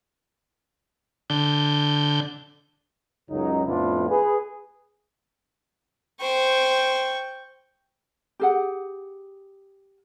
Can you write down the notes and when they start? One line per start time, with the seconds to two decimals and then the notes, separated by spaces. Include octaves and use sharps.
1.30 D3 G6
3.30 C#2 F#2 C#3 F#3 D#4
3.66 F2 A2 B3 D4 E4 F4
4.09 G#4 B4
6.21 C5 G5 C#6
8.40 G4 G#4 F#5